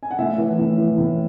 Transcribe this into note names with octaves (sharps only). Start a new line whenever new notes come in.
G#5
F#5
A2 E5
E3
A2
E3
A2